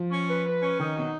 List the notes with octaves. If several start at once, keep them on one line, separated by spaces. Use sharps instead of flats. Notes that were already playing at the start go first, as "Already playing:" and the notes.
Already playing: F3
C#4
B4
B4
C#4
D#3 D#4
B2 F#3